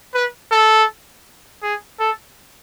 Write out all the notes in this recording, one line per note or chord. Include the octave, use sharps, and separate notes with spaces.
B4
A4
G#4
A4